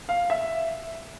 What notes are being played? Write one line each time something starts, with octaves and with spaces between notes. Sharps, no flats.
F5
E5